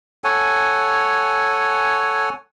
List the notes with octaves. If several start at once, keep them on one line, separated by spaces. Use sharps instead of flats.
A4 C#5 F#5 G#5